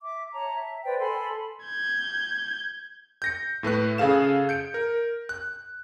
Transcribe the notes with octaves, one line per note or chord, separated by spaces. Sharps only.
E5 D6
C#5 A5 A#5
E5
B4 C5 D5 G5
A4 G#5 B5 C6
G6 G#6
G6 A#6 C#7
A2 A3 B4 F#6
C#3 G#4 A4 F5 E7
G6 C#7 D7
A#4
F#6